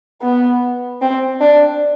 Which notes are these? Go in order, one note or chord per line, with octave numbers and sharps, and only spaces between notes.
B3
C4
D4